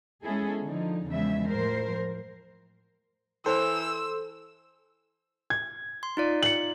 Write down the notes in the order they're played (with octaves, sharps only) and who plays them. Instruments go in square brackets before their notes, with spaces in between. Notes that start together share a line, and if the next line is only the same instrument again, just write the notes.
[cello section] G#3 B3 C#4 E4 G#4 A4
D3 F3 D#4
E2 C#3 F3 G#3 E5
A2 F3 A#4 C5
[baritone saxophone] E3 [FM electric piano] A4 [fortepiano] C5 [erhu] E6
[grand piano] G#6
[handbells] C6
D#4 F4 D5
[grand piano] C#7 F#7